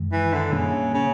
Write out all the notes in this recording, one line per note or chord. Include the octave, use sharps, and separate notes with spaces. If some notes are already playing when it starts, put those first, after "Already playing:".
Already playing: F#2 D#3 G#3
E3
D3
A#2 C#3 G3 A#3 C#4
C#3